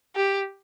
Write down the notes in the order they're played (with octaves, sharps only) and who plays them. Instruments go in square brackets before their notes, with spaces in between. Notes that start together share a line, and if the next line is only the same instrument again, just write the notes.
[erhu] G4